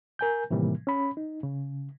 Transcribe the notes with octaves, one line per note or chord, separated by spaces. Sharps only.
A#4 G#5 G6
A2 C3 D#3 E3 G3 A#3
C#4 B5
D#4
C#3